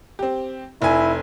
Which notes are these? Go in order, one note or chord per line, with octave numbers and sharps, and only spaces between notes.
C4 G4
F1 E4 G#5